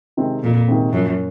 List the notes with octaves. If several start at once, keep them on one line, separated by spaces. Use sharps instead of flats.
C3 D#3 G#3 C4
F2 A#2
C3 D#3 G#3 C4
F#2 F3